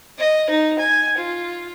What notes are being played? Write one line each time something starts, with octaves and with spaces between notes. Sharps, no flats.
D#5
D#4
G#5
F4